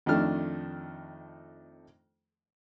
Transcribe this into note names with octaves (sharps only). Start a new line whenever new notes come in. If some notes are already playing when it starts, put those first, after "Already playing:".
F2 D#3 F3 A3 D4 F6